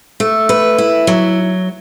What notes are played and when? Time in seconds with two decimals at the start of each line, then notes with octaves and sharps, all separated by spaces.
0.20 A3
0.49 B4
0.78 E4
1.07 F#3